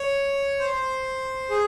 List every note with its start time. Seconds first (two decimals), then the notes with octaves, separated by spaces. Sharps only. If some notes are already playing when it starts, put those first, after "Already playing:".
Already playing: C#5
0.59 C5
1.50 G#4